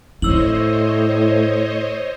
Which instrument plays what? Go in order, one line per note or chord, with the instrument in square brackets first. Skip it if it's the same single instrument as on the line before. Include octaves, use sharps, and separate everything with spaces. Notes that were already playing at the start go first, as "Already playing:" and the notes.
[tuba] A2 [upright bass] E4 [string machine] C5 C#5 D#5 [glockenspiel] E6 F#7